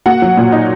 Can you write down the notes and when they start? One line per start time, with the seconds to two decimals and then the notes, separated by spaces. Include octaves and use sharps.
0.06 A#3 F#4 F#5
0.22 F#3
0.37 A#2
0.52 D#4